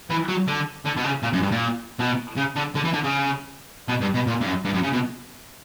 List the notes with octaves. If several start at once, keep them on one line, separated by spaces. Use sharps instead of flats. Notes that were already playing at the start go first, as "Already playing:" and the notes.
E3
F#3
D3
D3
B2
C#3
A#2
F#2
G2
A#2
B2
C#3
D3
D3
E3
D3
C#3
B2
G2
B2
A#2
G2
F#2
G2
F#2
C#3
B2